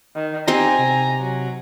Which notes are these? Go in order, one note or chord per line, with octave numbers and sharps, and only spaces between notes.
D#3
C4 D#4 G4 D#5 G#5 A#5
C3
F#3